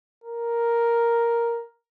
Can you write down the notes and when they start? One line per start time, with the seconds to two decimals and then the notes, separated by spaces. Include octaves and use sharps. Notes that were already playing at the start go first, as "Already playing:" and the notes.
0.24 A#4